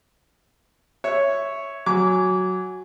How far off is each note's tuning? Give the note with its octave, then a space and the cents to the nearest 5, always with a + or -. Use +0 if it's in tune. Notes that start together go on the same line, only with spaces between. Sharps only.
C#5 +0 E5 +0
F#3 +0 G#5 +0 D6 -25